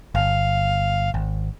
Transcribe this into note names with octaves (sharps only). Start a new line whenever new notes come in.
G1 F5
G#1